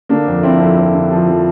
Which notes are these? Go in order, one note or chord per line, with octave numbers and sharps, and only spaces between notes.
D3 A#3 D4
F2
F2 C4 E4
F2
F2
D3
F3
F3